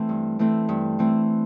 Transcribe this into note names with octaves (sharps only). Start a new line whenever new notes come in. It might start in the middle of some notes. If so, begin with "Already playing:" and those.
Already playing: E3 A3 C4
G2
E3 A3 C4
G2
E3 A3 C4